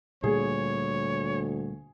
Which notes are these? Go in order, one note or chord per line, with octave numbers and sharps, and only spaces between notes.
D2 A#2 G3 A#3 G#4 C#5